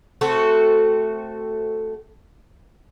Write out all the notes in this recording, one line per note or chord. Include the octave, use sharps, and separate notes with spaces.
A3 C4 F#4 A4